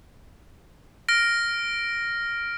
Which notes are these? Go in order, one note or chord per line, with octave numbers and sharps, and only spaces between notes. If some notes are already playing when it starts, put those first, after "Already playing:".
F6 A#6 D7